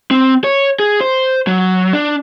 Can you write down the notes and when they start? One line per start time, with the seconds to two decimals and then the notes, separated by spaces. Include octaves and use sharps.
0.11 C4
0.44 C#5
0.80 G#4
1.01 C5
1.47 F#3
1.93 D4